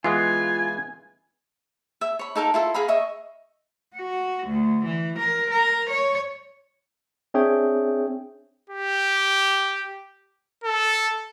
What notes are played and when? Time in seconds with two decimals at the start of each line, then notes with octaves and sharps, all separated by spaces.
0.04 E3 G#3 B3 F4 G#5
2.01 E5
2.19 C#5 B5
2.35 D#4 A4 A#4 F5
2.54 E4 F4 A4
2.74 G#4 F5 A#5 B5
2.88 D#5 E5 C#6
3.96 F#4
4.47 D2
4.85 E3
5.19 A#4
5.51 A#4
5.90 C#5
7.34 C4 D4 G#4 C#5 E5 G5
8.70 G4
10.64 A4